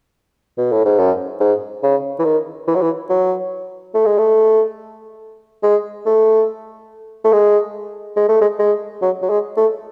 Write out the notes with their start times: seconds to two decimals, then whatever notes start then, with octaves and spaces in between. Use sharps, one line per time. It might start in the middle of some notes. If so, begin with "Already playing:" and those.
0.58 B2
0.72 A2
0.85 G#2
0.99 F#2
1.41 G#2
1.83 C#3
2.19 E3
2.25 D#3
2.68 E3
2.75 F#3
2.82 E3
3.10 F#3
3.94 A3
4.06 G#3
4.18 A3
5.63 G#3
6.06 A3
7.25 A3
7.33 G#3
8.17 G#3
8.29 A3
8.41 G#3
8.59 G#3
9.02 F#3
9.22 F#3
9.30 G#3
9.57 A3